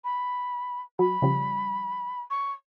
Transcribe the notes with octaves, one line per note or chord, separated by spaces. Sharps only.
B5
F#3 B5
C#3 F3 G3
C#6